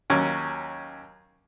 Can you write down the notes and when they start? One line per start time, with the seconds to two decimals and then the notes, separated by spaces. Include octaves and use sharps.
0.10 D#2 F#3 C#4